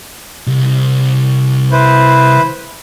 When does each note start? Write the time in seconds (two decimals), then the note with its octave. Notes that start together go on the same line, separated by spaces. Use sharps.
0.47 C2
1.72 E4 B4 C5